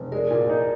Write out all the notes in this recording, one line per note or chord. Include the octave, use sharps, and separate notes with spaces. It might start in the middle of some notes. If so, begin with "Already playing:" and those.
Already playing: F1
G#3 A#4 D5
A#2
D#4